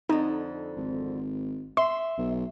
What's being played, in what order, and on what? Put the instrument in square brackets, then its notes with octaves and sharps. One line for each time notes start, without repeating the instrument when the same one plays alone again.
[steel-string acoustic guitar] F2 D3 [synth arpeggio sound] D#4
[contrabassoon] G#1
[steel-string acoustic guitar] E5 [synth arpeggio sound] C6
[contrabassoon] B1